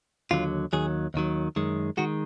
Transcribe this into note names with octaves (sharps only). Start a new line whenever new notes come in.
D#2 D3 F#3 F4
D#2 D#3 F#3 G#4
D#2 D#3 F#3
F#2 D#3 G#3
D#3 G#3 F#4